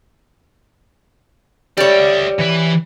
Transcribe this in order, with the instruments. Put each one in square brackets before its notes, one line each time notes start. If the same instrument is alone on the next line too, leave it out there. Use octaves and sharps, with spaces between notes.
[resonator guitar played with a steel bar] G3 C#5 [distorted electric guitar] D5 E5
[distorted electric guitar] E3 B4